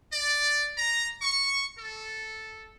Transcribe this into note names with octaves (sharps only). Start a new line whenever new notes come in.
D5
A#5
C#6
A4